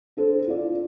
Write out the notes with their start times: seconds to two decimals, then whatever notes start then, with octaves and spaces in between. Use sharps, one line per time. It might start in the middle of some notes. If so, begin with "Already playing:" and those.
0.17 D4 A4 C5
0.48 F4 D5